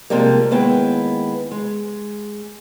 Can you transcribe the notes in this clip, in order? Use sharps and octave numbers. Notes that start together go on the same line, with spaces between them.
C3 F3 G3 G#3 A#3
D#2 G#3 B3 E4 G5
G#3